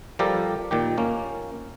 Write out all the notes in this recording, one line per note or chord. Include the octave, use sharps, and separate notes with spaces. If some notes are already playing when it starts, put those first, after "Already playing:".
F3 G3 G4 A4 A#4 D5
A#2 D#3 G4
A#3 C#4